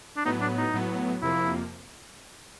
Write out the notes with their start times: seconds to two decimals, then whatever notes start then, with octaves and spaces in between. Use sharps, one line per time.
0.17 D4
0.25 A2 F#3 B3 D#4
0.41 D4
0.58 D#4
0.74 A2 F#3 B3
1.22 F2 C3 F3 A#3 E4